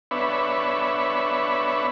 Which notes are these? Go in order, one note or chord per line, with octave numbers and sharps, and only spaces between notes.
B3 D4 B4 C#5 E5